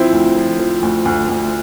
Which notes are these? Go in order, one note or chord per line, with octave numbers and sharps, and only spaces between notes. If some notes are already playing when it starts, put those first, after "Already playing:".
Already playing: F3 C4 E4
D2
F3
F3
D2
D2
D2